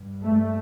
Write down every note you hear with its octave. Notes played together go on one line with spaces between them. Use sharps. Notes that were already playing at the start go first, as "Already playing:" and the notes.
Already playing: G2
A3